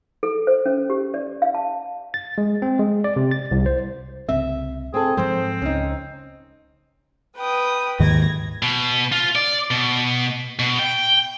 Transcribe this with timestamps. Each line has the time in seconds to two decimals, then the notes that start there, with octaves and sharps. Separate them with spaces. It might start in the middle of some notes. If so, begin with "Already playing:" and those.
0.23 A4
0.47 C5
0.66 C#4
0.90 G4
1.14 D5
1.42 F5
1.55 A5
2.14 A6
2.38 G#3
2.62 C4
2.79 G#3
3.04 D5
3.16 C3
3.31 A6
3.51 C2
3.66 C5
4.29 C2 C#3 C4 E5
4.94 C4 G#4 A4
5.17 G#2 F3 F#3 C4 C5
5.62 C#2 C#4 D#4
7.37 B4 G5 D#6
8.00 D#2 G#2 D#3 G#6 A#6
8.63 B2
9.12 F4
9.35 D5
9.71 B2
10.59 B2
10.79 G5